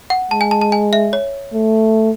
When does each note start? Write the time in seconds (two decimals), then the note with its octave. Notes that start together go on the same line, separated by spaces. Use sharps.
0.10 F#5
0.31 G#3 A5
0.41 G#5
0.51 A5
0.61 A5
0.72 G#5
0.93 E5
1.13 C#5
1.54 A3